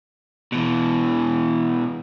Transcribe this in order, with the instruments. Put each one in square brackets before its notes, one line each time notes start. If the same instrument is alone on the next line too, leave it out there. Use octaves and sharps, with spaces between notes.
[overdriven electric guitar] B2 E3